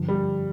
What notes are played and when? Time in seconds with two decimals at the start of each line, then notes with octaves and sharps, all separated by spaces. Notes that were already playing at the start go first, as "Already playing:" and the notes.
Already playing: G2 D3 F3
0.08 G3